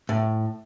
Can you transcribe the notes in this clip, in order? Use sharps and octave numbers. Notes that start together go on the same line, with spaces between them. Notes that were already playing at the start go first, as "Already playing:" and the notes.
A2